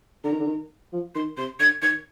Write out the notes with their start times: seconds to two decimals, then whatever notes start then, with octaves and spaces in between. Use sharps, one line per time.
0.24 D3 A#5
0.32 D#3
0.40 D3
0.47 D#3
0.93 F3
1.15 D#3 C6
1.37 C3 C6
1.60 D3 G#6
1.82 D#3 G#6